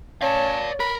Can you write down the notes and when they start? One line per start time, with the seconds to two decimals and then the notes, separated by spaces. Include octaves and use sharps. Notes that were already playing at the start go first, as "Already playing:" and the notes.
0.22 C#4 C#5 D5 F5 A5
0.80 A#4 B5